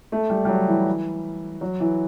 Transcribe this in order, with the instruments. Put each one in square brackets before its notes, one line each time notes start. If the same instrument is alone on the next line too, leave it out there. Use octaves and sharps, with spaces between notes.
[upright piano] A3
G3
G3
F#3
E3
F#3
E3